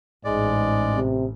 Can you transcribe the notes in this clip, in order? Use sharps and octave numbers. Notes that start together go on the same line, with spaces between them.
A1 G#2 G#3 D5
C3